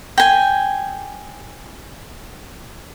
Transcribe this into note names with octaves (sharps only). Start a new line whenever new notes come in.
G5 G#5